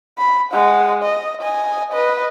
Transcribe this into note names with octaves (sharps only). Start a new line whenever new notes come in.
B5
G#3 F#5
D#5
D#5 G#5
B4 D#5